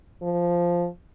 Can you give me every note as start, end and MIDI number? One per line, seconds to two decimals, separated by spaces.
0.23 0.87 53